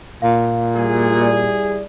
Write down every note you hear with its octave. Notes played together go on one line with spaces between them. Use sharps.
A#2 F5
G3 E4 G#4
D5